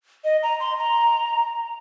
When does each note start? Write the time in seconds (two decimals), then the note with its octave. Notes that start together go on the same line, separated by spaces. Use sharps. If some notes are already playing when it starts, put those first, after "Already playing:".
0.24 D#5
0.43 A#5
0.60 C6
0.78 A#5